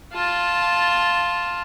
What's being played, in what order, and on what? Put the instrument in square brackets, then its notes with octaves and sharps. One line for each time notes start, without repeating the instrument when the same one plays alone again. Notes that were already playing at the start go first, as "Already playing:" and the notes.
[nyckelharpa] F4 A5